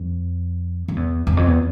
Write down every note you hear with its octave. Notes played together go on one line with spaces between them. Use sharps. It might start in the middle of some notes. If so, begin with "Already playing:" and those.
Already playing: F2
F2
E2
E2
F2
E2